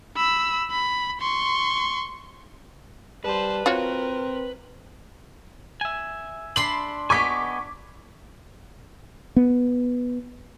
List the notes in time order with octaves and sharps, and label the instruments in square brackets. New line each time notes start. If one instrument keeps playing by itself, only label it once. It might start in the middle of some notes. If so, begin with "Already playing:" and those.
[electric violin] B5 E6
B5
C6 C#6
[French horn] G3 [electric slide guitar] B4 [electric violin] C5 A5
[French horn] C4 [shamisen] F4 F#4 C#5 [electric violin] A#4
[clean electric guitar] E5 G#5
[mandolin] D4 B5 C6 [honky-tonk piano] F#7
[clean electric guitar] B3 D#5 G#5 [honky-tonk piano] C#6 D6 B6
[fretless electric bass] B3